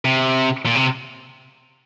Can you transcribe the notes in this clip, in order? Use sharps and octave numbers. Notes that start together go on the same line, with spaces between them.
C3
A#2
C3